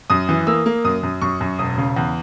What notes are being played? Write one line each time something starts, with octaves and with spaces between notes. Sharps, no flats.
F#2 D#6
E3
A#3 E6
A#3
F#2 D#6
F#2
F#2 C#6
F#2
E1 D#6
C#3
E2